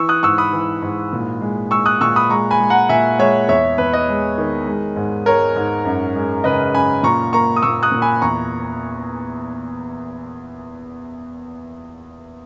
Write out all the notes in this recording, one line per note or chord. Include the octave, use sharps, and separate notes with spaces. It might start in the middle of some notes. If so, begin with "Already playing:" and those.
Already playing: E3 C#6 E6
D#6 F#6
G#2 C#6 E6
B5 D#6
E3
G#2
A#2
G#3
G#3 C#6 E6
D#6 F#6
A#2 C#6 E6
B5 D#6
G#3 A#5 C#6
G#5 B5
G#3
F#5 A#5
A#2 E5 G#5
G#3 C#5 E5
E2 C#5 E5
E2 B4
B4 D#5
G#3
D#3
G#3
G#2
G#3 A#4 C#5
G#2
F#2
G#3
C#3 B4 D#5
F#2 G#5 B5
A#2 A#5 C#6
A#3 A#5 C#6
D#6
A#2 C#6 E6
D#6 F#6
A#2
G#5 B5
E2 A#5 C#6